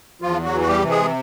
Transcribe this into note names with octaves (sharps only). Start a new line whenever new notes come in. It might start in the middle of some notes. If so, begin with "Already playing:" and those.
E2 F3 F4
F#3 F#4
E3
F#4
G3 G4
C3
G#3 G#4